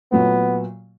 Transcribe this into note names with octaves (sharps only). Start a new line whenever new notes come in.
A#2 F#3 A3 B3